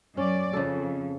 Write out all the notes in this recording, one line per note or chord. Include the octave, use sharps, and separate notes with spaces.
F#2 C#4 D5
F2 C#3 A4